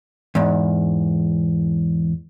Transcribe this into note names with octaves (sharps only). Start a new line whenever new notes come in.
E2 G#2